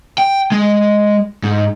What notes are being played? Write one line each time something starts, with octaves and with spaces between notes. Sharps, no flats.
G5
G#3
G#2